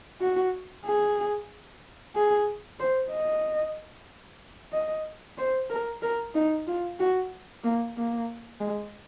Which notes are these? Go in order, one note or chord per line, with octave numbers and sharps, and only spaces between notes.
F#4
G#4
G#4
C5
D#5
D#5
C5
A#4
A#4
D#4
F4
F#4
A#3
A#3
G#3